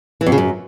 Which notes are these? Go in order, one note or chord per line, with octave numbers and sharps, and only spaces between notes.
E3
F2
C#3
F#2